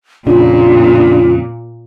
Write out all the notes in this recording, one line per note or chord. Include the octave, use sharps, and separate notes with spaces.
F2 A#2 C#3 D4 F4